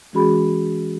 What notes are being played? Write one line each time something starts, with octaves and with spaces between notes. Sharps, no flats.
E3 G#3 C#4 F#4 G#4 B5